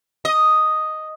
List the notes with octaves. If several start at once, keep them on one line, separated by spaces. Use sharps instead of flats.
D#5